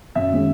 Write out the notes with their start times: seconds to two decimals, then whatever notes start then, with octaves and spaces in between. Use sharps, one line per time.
0.15 F#2 E5
0.31 D#3 G#3 C#4